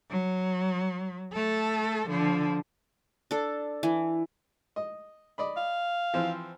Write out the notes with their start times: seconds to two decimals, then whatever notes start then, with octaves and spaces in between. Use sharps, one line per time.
0.10 F#3
1.34 A3 A4
2.08 D3 F3
3.31 D4 A4
3.83 E3
4.76 D#5
5.38 D5 D#5 B5
5.57 F5
6.13 E3 F3 C4